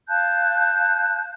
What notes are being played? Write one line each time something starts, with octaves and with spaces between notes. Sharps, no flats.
F5 A5 F#6 G6